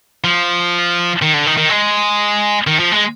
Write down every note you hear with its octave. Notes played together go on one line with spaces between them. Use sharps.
F3
D#3
D3
D#3
D#3
G#3
D#3
F3
G#3